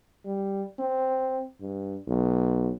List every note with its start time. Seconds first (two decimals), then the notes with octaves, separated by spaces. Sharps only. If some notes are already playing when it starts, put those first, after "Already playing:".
0.26 G3
0.79 C4
1.61 G2
2.08 B1